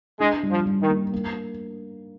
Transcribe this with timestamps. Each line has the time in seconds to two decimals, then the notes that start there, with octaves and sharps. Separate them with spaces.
0.20 G#3 D4
0.43 G3
0.51 F3
0.66 G3
0.82 D#3
0.89 A#3
1.13 A#3